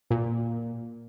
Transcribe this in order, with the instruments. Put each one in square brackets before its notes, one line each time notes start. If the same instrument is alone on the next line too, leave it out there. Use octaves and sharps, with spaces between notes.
[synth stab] A#2